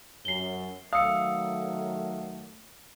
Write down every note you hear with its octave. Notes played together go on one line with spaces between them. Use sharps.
F#2 C7 G7
D#3 F#3 A3 F5 D#6 E6 C#7